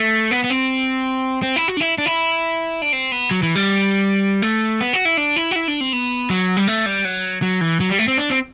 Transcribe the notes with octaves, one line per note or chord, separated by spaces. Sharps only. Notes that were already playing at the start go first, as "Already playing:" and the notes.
Already playing: A3
B3
B3
C4
C4
E4
F#4
D4
E4
D4
E4
D4
C4
B3
F#3
E3
G3
A3
B3
F#4
E4
D4
E4
F#4
E4
D4
C4
B3
F#3
G3
A3
G3
F#3
F#3
E3
F#3
G3
A3
C4
D4
C4